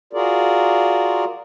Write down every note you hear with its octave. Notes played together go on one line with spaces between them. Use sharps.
F4 F#4 G#4 A#4 D5